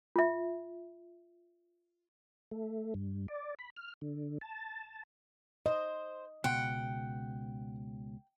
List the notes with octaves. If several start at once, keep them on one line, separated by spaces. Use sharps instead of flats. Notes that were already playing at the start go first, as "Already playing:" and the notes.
F4 E5
A3
G2
D5
B5
F6
D3
A5
C5 D#5
C#2 B2 F#5 G5 C6